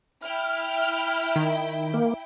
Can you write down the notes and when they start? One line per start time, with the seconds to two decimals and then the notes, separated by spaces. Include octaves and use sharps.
0.22 E4 G5 F6
1.36 D#3
1.94 A#3